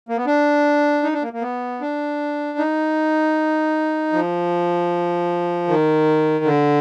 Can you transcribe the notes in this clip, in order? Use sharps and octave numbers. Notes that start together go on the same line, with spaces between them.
A#3
B3
D4
D#4
D4
A#3
A#3
B3
D4
D#4
F3
D#3
D3